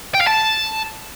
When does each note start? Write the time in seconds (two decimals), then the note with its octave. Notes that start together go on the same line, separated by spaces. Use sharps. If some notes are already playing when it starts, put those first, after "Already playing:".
0.14 G5
0.21 F5
0.27 A5